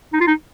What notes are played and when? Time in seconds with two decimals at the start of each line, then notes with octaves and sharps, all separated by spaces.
0.13 D#4
0.21 F4
0.27 D#4